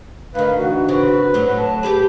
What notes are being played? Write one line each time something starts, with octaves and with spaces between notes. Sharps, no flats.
D2 D#3 B4 F5
E3 F#4
C#3 C4 B4
A2 F#3
A5
G4 G#4 B4